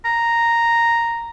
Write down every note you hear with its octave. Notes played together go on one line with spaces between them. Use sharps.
A#5